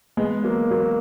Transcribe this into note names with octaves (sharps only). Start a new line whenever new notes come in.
G#3 B3
F#3 A#3
F#3 A#3